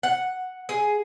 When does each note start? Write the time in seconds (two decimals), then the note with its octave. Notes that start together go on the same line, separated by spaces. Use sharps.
0.03 F#5
0.69 G#4